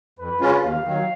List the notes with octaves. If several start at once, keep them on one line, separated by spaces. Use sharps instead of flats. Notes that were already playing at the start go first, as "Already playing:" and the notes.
F2 B4
C#3 G#3 C#4 F4
D#2 F5
D#3 F#3